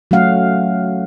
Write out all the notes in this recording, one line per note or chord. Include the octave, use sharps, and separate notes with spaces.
F#3 A3 C#4 F5 F#5